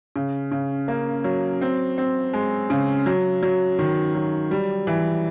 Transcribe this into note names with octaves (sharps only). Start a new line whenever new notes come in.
C#3
C#3
A#3
F#3
C4
C4
G#3
C#3
F#3
F#3
D#3
F#3
G3
E3